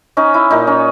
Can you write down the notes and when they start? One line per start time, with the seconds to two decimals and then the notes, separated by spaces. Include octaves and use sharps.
0.17 C#4 D#4
0.34 E4
0.50 A#2 D#4
0.67 C#4